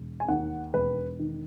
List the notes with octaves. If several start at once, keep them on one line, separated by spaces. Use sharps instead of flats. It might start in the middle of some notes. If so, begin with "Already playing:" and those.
Already playing: E1
G#5
D#2 F#5
E1 B4
D#3